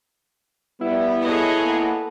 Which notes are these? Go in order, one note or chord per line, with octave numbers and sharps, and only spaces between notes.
G3 B3 E4
G#4 A4 B4 C#5 D#5
A#3 B3